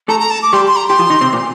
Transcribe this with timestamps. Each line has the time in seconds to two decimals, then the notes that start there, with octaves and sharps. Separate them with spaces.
0.08 A3 A4 A#5
0.19 A#5
0.30 A5
0.42 D6
0.53 G3 G4 C6
0.67 C6
0.76 A#5
0.88 G4 C6
0.99 F3 F4
1.10 D#3 D#4
1.21 C3 C4
1.33 A#2 A#3